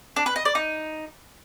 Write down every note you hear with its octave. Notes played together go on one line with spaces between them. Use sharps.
D4
B4
D#5
D5
D#4